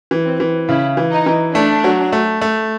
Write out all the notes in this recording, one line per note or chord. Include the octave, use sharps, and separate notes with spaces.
E3
C4
E3
C#3 E4
E3
D#4
E3
A3 D4
F#3
A3
A3